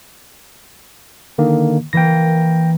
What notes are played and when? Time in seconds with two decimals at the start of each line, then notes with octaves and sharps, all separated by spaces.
1.38 D3 D#3 A#3
1.93 E3 A#3 G5 A#6